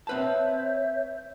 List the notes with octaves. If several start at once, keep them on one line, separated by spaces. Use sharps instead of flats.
C4 B4 C#5 E5 A5 G6